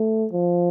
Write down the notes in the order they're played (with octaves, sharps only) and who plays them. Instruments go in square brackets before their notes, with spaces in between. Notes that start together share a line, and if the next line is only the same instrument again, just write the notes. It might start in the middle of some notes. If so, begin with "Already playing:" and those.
Already playing: [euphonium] A3
F3